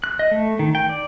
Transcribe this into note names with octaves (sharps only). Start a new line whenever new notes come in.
F#6
D#5
A3
D#3
G5
D5